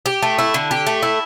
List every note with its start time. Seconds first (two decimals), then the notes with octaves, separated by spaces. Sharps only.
0.06 G4
0.22 A3
0.39 E4
0.54 D3
0.71 G4
0.87 A3
1.03 E4